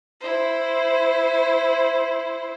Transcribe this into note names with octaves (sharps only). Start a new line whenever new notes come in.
E4 C5